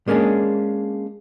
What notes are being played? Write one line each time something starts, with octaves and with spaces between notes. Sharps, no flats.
G#3 A#3 C#4 D4 G#4